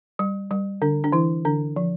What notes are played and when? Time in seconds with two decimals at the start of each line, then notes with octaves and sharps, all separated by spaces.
0.19 G3
0.51 G3
0.82 D3 D4
1.04 D4
1.13 E3 E4
1.45 D3 D4
1.76 F3